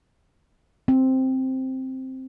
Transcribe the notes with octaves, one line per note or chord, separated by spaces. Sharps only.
C4